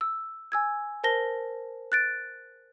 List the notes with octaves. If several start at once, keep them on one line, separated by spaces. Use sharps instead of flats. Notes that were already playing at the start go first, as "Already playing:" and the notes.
E6
G#5 E6 G#6
A#4 C5 A5 A#6 G7
F#6 A6 D7